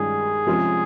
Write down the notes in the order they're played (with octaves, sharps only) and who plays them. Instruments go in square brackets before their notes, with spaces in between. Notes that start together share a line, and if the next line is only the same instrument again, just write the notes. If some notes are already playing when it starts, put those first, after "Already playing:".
Already playing: [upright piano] G2 D#3 G#3 C#4 F4 [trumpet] G#4
[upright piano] C3 F3 G#3 C#4 F4